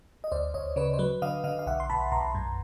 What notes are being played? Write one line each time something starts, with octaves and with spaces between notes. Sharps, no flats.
D#5
D2 C5 D5
D2 C#5 D#5
C#3 B4 C#5
C5
F#3 B4
D3 D#5 F5
D3 D#5 F5
F5
B1 E5 F#5
C6
B1 A5 B5
B1 A#5 C6
F#2